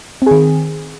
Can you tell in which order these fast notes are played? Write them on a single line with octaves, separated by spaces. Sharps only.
C4 G#4 D#3